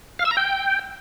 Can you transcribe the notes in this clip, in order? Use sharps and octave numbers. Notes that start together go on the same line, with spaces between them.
F5
E6
A#5
G5